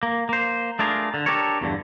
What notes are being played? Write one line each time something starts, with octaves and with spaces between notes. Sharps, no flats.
A#3
A#3 C5
A3 D4 F4 G#4 A#4
D3
D4 G4 A4 A#4 C#5
E2 G2 D3